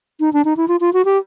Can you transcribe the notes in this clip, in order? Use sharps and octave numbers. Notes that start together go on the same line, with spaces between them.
D#4
D4
D#4
E4
F4
F4
F#4
G4